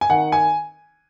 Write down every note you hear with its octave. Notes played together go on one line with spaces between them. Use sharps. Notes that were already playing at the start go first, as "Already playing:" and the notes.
G#5
D#3 F#5
G#5